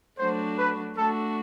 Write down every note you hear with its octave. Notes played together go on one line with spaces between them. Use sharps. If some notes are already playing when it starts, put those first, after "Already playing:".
F#3 A3 D4 F#4 C5
B4
A3 D4 F#4 A4